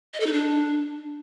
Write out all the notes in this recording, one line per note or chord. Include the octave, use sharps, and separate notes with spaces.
D#5
A4
D#4
D4